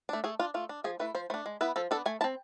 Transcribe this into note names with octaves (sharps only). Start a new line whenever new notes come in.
A3 D4
A3 G#4
D4 F4
A3 F4
D4
F3 G#4
A3 E4 B4
F3 C5
A3 D4 C5
G#3
B3 E4 B4
F3 A4
B3 D4 A4
A3 G#5
E4 A5
C4